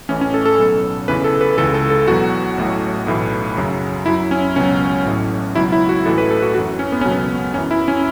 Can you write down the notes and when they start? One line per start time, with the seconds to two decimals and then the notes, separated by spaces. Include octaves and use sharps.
0.09 A1 A2 E3 C#4
0.21 C#4
0.34 A4
0.45 A4
0.58 B1 B2 F#3
1.08 E2 C#3 E3 B4
1.24 A4
1.41 B4
1.58 C#2 C#3 E3 A4
1.74 A4
1.90 A4
2.08 E2 B2 F#3 F#4
2.58 A1 A2 F#3
3.07 B1 A2 E3
3.57 F#2 C#3 F#3
4.06 F#2 F#3 E4
4.31 C#4
4.56 C#2 B2 F#3 C#4
5.05 A1 A2 F#3
5.55 C#2 B2 F#3 E4
5.72 E4
5.89 F#4
6.05 A1 A2 E3 A4
6.18 B4
6.31 A4
6.42 F#4
6.54 F#2 E3 F#4
6.79 C#4
6.92 B3
7.01 C#2 B2 F#3 C#4
7.11 B3
7.54 F#2 E3 C#4
7.71 E4
7.88 C#4